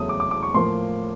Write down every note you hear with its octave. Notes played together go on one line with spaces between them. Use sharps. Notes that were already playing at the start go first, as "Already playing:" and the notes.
Already playing: E2 C#3 F#3 A3 D#6
D6
D6
D6
C#6
A2 F3 A#3 C6